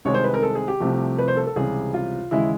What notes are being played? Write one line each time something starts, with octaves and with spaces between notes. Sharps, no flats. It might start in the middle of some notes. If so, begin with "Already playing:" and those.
C2 C3 D#3 G#3 C4 C#5
C5
B4
A#4
A4
G#4
G4
C2 C3 F3 A3
B4
C5
A4
A4
C#2 C3 E3 G3 G#4
F4
D#2 C#3 E3 G#3 E4